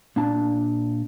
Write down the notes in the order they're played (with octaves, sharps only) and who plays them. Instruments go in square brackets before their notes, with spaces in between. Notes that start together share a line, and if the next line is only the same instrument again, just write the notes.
[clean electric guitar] A#2 D4 A5